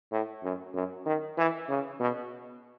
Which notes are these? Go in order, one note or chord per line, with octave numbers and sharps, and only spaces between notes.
A2
F#2
F#2
D#3
E3
C#3
B2